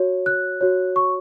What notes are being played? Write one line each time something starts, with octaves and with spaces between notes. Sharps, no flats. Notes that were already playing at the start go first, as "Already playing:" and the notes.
Already playing: F#4 C#5
F#6
F#4 C#5
C#6